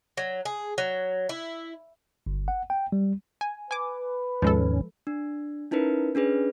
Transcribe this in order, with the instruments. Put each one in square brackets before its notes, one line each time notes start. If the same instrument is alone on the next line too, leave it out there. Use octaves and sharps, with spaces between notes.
[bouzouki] F#3
G#4
F#3
E4
[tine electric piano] G1
F#5
G5
G3
[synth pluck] G#5
[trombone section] B4 [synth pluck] G#5 D6
[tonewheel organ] D#2 G#2 C#4 [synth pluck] F3 G#3 A4
[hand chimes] D4
C#4 D#4 E4 A#4 B4
C#4 D4 G#4 B4